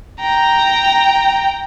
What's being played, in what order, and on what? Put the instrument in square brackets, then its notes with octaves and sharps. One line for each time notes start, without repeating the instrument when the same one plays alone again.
[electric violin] G5 A#5